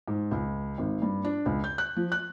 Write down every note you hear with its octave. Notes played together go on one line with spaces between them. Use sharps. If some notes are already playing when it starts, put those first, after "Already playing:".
G#2
C#2
G#1
G2
D4
C#2
G6
F#6
F3
F#6